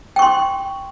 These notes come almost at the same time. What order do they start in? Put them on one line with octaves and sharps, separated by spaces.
G5 C#6 C6